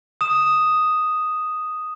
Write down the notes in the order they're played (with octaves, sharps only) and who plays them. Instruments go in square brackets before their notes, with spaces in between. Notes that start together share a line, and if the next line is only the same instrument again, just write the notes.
[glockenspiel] D#6 E7